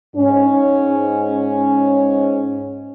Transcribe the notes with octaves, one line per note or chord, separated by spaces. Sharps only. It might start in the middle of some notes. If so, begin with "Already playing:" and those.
G#2 C#4